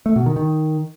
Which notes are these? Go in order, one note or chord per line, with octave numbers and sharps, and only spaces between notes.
A3
B2
D#3
D#3